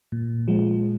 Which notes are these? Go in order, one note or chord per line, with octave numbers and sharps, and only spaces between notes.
A#2
F3 G#3